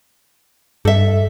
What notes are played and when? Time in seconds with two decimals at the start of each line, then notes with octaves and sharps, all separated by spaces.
0.85 G2 A4 E5